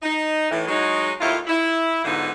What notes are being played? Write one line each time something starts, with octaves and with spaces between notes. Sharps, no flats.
D#4
A2 E3
F#3 G#3 D#4
D#2 A2 E4 F4
E4
G#2 B2 D3 F3 B3 D#4